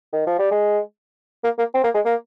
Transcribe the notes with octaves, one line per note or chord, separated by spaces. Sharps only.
D#3
F3
G3
G#3
A#3
A#3
C4
A#3
G#3
A#3